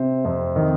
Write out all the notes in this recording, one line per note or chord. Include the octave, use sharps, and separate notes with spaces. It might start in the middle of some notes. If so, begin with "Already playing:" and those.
Already playing: C3 C5
F2
D#3